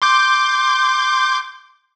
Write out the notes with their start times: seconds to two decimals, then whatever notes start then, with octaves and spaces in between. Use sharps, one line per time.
0.02 C6 D6 G6